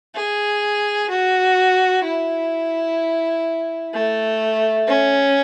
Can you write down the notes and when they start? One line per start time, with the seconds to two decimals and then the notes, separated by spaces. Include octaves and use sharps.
0.15 G#4
1.09 F#4
2.04 E4
3.94 A3
4.88 C#4